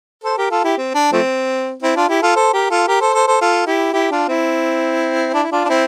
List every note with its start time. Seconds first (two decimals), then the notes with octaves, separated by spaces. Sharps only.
0.24 A4 C5
0.38 G4 A#4
0.51 F4 A4
0.64 E4 G4
0.78 C4
0.95 D4
1.12 F3 A3 C4
1.82 C4 E4
1.96 D4 F4
2.08 E4 G4
2.22 F4 A4
2.36 A4 C5
2.53 G4 A#4
2.70 F4 A4
2.88 G4 A#4
3.01 A4 C5
3.14 A4 C5
3.27 A4 C5
3.41 F4 A4
3.67 E4 G4
3.93 E4 G4
4.11 D4 F4
4.28 C4 E4
5.34 D4
5.43 E4
5.52 D4 F4
5.65 D4
5.69 C4 E4